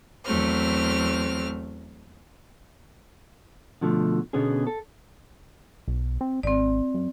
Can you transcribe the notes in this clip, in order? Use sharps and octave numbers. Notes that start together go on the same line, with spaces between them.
E2 F#3 A3 C4 F6
B2 D3 F3 A3
B2 D3 B3 C#4 G#4
A4
B1
C4
G#1 C4 D5
F#2